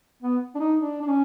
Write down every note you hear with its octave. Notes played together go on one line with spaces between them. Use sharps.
B3
D4
D#4
D4
D4
C#4